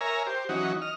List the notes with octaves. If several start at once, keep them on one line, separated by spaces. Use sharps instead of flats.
A#4 C#5 E5 G#5 A#5
G4 C5
E3 F#3 C#4 D#4 F#4
D#5 F6